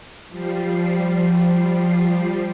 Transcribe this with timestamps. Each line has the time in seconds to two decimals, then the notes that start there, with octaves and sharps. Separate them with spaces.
0.28 F3 G3 C7